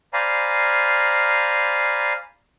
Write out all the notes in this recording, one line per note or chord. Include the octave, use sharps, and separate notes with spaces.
C5 D5 F5 G#5 A#5 B5